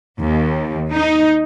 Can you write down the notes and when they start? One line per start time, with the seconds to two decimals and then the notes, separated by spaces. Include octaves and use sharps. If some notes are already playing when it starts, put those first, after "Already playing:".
0.20 D#2
0.92 D#4